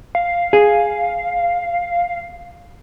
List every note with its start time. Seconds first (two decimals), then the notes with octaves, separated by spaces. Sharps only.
0.15 F5
0.53 G#4